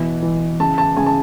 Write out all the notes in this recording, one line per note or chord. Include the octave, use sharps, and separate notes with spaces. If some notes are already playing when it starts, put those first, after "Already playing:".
Already playing: B2 E3
E3
C#3 A5
A5
C#3 G#5
A5